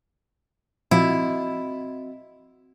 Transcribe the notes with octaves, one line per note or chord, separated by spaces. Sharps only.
A#2 F3 C4 E4 F#4 D#5 F5